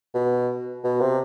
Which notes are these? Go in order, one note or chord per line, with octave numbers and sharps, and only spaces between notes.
B2
B2
C3